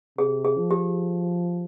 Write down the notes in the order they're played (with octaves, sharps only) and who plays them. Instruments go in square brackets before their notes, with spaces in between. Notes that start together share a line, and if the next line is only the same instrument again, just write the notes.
[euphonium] C3 [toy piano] G#4
[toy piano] G#4
[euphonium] F3
[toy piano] G4